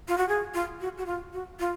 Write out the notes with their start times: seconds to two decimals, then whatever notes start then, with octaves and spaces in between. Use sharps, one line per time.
0.08 F4
0.18 F#4
0.29 G#4
0.54 F4
0.81 F#4
0.98 F#4
1.06 F4
1.33 F#4
1.60 F4